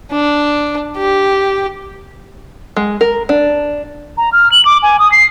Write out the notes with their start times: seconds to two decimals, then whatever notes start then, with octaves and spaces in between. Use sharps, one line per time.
0.11 D4
0.98 G4
2.76 G#3
3.01 A#4
3.29 D4
4.17 A#5
4.32 F6
4.52 F#7
4.65 D6
4.82 G#5
4.99 D#6
5.12 C7